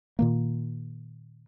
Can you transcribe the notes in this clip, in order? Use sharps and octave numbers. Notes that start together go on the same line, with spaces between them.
A#2 D#3 A#3